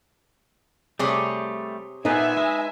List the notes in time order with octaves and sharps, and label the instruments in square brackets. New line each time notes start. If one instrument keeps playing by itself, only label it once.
[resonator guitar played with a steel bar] C3 G#4 C#5 [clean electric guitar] G3 A3
[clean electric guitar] A#2 B3 C4 [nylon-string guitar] D#4 B4 [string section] E5 G#5
[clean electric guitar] G#3